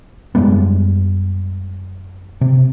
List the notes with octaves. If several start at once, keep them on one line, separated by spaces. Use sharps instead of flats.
F#2 G3 G#3 B3
C3